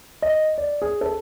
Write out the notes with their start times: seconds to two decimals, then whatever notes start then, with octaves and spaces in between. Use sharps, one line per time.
0.22 D#5
0.58 D5
0.82 G#4
1.01 A4